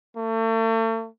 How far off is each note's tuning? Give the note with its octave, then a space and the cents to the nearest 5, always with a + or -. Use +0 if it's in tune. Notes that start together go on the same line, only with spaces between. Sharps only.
A3 +40